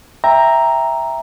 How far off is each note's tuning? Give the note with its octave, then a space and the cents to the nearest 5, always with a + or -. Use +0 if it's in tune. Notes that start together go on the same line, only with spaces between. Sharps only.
E5 +0 G5 +20 A#5 +0